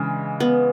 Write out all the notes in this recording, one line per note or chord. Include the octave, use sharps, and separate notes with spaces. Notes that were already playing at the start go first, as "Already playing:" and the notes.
Already playing: C#3 E3 G#3 D4
B3